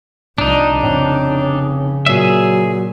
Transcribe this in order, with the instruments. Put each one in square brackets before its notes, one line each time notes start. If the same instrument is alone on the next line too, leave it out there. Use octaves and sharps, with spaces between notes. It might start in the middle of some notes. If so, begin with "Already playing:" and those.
[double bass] C2 F3 [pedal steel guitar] D4 D#4 [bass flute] D5
[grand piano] F1 F2 C5 [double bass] C#3 [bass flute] C#5
[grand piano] A#2 A#3 C#5 [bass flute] F#3 [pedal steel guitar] G#4 E5